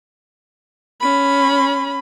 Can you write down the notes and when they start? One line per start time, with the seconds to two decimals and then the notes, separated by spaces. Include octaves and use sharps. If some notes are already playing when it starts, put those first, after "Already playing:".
1.01 C#4 B5